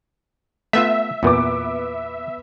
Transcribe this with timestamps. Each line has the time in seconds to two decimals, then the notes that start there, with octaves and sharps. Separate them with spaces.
0.73 A3 B3 F4 E5
1.23 E2 A#2 B3 D6